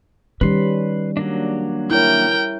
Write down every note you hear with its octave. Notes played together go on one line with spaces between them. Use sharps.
D#3 G3 C#4 B4 C6
F#3 A#3 D4
E4 A#4 C#5 G5